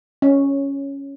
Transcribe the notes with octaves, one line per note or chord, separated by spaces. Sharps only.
C#4